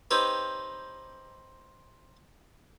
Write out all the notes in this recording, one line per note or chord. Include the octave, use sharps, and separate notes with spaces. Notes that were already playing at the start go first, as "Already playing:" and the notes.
C4 D#4 G4 B4 C#5